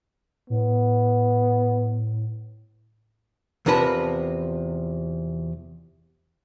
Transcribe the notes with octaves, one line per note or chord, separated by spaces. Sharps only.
A2 B3
E2 C3 F3 A#4 B4 A5